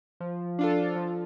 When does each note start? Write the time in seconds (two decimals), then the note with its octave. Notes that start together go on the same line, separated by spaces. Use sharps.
0.20 F3
0.59 D4 F4 A4
0.96 F3